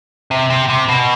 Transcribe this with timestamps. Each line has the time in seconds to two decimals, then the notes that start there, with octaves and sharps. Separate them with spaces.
0.31 C3
0.50 C3
0.70 C3
0.88 B2